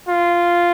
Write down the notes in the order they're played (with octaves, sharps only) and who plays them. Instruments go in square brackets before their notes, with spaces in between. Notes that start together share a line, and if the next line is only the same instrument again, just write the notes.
[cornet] F4